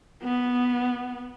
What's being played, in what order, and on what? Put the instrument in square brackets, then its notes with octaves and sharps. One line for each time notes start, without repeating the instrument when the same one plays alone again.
[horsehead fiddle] B3